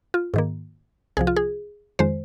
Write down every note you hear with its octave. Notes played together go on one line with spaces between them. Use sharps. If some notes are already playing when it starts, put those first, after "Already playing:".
F4
G#2 D#3 A#3
C2 C3 F3 G#4
F4
G#4
F2 D#3 G#3 C5